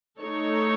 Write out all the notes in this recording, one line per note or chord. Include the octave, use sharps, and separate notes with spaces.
A3 D#4 A4 C#5